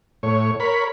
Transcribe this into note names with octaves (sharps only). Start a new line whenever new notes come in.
A2 C#5
A#4 C#5 B5